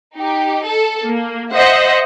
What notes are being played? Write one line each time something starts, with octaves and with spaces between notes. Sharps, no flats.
D#4 G4
A4
A#3
C5 D#5 E5 F#5